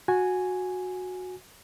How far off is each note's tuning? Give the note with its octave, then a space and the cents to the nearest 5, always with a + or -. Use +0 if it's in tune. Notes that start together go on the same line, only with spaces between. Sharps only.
F#4 -15 G#5 +0